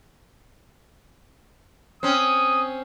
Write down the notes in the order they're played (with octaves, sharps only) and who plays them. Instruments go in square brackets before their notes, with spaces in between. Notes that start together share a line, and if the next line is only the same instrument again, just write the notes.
[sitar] C4 C#4 [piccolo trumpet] D#6